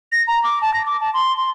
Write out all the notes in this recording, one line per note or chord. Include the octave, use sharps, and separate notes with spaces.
A#6
A#5
D6
A5
A#6
D6
A5
C6
C6